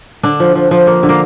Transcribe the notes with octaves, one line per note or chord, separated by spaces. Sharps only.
D3 D4
F3
F3
F3
A#3
D3
A#3